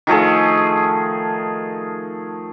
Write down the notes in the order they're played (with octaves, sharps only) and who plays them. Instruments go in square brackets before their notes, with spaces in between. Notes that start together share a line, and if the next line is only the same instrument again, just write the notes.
[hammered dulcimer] D#3 F3 A3 G#4